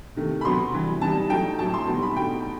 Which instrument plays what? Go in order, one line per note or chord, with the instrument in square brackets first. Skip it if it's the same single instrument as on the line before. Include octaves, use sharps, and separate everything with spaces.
[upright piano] C3 D#3 A3
B5
B2 F#3 B3 C6
C3 E3 G3
E3 G3 D#4 A5
F#3 A3 D#4 G5
A2 F#3 A3 E4 A5
C6
B2 G3 B3 D#4
B5
B2 A3 D#4 G5